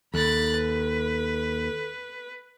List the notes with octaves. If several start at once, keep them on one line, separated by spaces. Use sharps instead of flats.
D#2 A4 B5 F#6 A6
B4